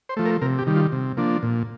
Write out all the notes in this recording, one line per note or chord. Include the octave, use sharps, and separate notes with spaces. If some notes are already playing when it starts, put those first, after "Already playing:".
C5
F3 A3
A#4
C3 A#4
G4
D#3 G3
F4
C3
F3 A#3 D4
A#2